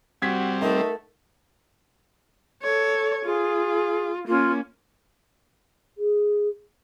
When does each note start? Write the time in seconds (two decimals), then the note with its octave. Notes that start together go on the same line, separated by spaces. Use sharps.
0.22 G3 C4 F#4 G#6 B6
0.62 A3 D#4 A#4
2.63 A4 C#5
3.25 F4 G#4
4.28 A#3 C#4 F4
5.98 G#4